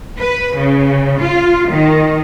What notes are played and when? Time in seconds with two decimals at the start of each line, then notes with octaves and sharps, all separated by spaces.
0.18 B4
0.57 C#3
1.22 F4
1.70 D#3